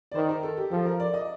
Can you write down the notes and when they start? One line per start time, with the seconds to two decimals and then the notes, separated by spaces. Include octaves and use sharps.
0.12 D5
0.15 D#3 C5
0.29 A#4
0.43 A4
0.57 G4
0.71 F3 A4
0.85 A#4
1.00 D5
1.14 D#5